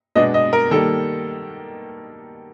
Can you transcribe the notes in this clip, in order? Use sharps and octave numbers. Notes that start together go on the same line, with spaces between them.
B2 G#3 B3 D4 D#5
D#5
A#4
D#3 G3 A#3 A4